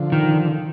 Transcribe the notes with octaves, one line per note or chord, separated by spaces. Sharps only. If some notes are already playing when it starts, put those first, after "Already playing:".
Already playing: D3 F3
D#3